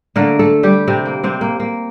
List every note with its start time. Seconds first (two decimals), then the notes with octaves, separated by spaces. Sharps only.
0.16 D3 A3 A#3 A#4
0.39 A3 A4
0.63 G3 G4
0.88 C3 C4
1.06 A#3
1.24 C3 C4
1.41 A#3
1.60 A#3